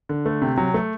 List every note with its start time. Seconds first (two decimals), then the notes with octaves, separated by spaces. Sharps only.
0.09 D3
0.26 A3
0.42 C3
0.57 F#3
0.74 A3